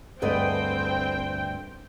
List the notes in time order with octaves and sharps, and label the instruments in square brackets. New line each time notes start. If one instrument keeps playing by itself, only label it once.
[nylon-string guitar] D2 G2 A3 [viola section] C4 G5 [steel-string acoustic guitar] G#4 B4 D#5